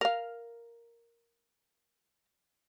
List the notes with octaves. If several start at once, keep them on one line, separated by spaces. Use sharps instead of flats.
A#4 F5